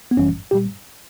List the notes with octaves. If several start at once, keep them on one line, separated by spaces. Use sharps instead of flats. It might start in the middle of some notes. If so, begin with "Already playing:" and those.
B3
G1 F#2 E3 G3 C#4
A#2 G3 G4